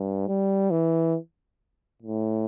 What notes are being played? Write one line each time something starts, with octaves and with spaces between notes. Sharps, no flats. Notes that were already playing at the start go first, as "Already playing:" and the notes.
Already playing: G2
G3
E3
A2